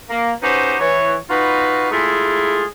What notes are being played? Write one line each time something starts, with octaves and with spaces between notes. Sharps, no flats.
A#3
C#4 D#4 F#4 G4 B4 C5
E3 C#5
D#4 F4 F#4 B4
G#3 A3 E4 F4 G#4